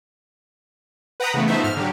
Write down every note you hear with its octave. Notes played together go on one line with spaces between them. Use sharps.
B4 F#5 G5 A#5 B5 D#6
C#3 E3 A3 B3
F3 A3 B3 D#4 C5 E5
G#2 F6
D3 F#3 G4